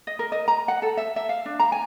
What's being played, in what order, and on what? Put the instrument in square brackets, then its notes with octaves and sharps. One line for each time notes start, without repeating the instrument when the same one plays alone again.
[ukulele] D#5
A#4
D#5
A#5
F#5
A4
E5
E5
F5
D4
A#5
G#5